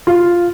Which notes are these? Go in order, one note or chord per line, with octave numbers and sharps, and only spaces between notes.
F4